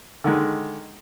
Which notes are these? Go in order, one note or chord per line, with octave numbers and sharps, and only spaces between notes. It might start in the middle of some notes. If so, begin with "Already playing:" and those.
D3 D#3 G#3